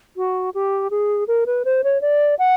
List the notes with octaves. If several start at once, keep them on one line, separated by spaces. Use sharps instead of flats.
F#4
G4
G#4
A#4
B4
C5
C#5
D5
F#5